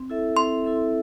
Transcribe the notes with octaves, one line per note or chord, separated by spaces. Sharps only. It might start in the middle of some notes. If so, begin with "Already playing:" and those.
Already playing: C4
E4 A4 E5
C4 C6
E4 A4 E5